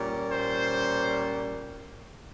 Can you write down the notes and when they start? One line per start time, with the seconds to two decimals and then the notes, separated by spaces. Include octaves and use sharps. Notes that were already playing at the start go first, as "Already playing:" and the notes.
Already playing: A#2 G3 C#4
0.32 C5